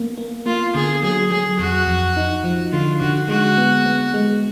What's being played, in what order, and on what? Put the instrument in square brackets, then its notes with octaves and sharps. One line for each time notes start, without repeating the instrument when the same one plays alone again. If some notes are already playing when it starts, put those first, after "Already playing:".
Already playing: [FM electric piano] A#3 B3
A#3
[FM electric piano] A#3 [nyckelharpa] F4
[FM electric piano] D3 [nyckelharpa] G#4
[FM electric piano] F#3 [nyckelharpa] G#4
[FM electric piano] F#3 [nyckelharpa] G#4
[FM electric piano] F2 [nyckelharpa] F#4
[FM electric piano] F2
D#4
F3
[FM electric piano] D3 [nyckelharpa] F4
[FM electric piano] D3 [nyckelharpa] F#4
[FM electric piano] G#3 [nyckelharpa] F#4
[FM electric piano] B3
B3
G#3